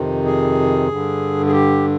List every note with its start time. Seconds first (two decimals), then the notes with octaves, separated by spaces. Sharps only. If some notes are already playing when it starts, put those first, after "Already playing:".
Already playing: F2 C3 D#3
0.25 G#4
0.88 G2 D3
1.46 G#4
1.52 G4